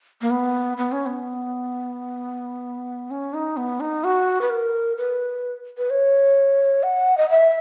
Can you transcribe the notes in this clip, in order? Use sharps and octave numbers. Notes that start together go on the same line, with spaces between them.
A#3
B3
B3
C#4
B3
C#4
D#4
B3
D#4
F#4
B4
A#4
B4
B4
C#5
F#5
D#5
E5